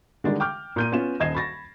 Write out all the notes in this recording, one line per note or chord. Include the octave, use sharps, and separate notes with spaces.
D3 D#3 G3 G#3 D4
G5 D6 F6 G6
A#2 G6 D#7
B3 C#4 F4 E7
D#1 D#5 G#6 C7 E7
B5 C#6 A6 A#6